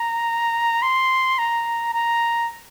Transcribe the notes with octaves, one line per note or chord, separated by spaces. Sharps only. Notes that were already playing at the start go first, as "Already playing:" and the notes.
Already playing: A#5
C6
A#5
A#5